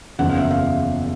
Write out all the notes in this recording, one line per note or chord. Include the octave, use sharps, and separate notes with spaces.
F#1 E2 C#3 F3 F#5
F5
E5
F5